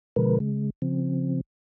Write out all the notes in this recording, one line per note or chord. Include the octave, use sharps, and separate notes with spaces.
B2 D3 F3 G#3 A#4 B4
C#3 G#3
C#3 F3 C4